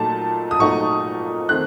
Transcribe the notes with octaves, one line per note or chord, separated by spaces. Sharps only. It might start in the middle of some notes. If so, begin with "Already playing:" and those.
Already playing: A#2 F#3 A3 D#4 A5
D#6
A#2 F#3 A3 D#4 C#6
D#3 A3 C4 F#6